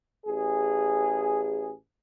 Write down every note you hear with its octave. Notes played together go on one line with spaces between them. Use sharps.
A1 G#4